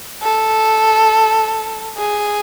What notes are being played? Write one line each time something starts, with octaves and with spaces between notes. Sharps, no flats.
A4
G#4